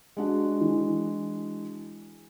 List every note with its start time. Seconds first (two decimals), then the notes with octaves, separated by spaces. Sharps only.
0.17 G#3 D4 F#4
0.61 E3